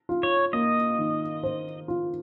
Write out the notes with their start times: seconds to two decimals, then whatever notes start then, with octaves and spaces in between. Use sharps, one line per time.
0.09 F4
0.23 C#5
0.53 A#3 D#5
0.98 D#3
1.43 C5
1.88 F4